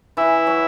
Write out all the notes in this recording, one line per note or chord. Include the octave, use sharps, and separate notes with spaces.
E3 E4
F#3